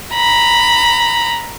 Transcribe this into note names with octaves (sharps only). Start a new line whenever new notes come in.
A#5 B5